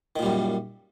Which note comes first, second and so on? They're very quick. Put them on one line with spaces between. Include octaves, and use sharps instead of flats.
D#3 A#2 G3 F#2